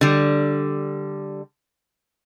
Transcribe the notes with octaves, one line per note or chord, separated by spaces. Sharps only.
D3 G3